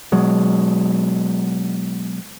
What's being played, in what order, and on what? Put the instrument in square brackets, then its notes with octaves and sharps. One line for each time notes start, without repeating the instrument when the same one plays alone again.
[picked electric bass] B2 F#3 G#3